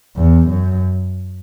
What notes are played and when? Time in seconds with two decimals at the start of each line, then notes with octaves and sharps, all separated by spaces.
0.17 E2
0.49 F#2